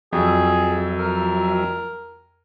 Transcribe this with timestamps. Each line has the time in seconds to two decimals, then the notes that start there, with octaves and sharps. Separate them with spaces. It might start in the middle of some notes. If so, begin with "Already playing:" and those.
0.13 F2 F3 F#3 G#4 E5
0.98 A#4